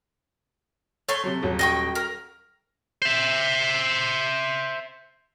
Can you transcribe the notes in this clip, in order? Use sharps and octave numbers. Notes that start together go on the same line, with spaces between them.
A3 C#5 C6
C3 F#3
D#1 F#3 G3
D#5 G5 C#6
A#4
C5 E5